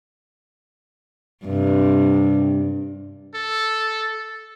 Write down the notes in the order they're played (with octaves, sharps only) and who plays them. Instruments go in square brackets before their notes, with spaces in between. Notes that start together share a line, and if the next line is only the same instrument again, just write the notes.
[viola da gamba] G2 C3
[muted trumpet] A4